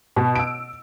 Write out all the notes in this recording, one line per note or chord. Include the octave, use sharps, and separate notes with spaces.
B2
E6 D7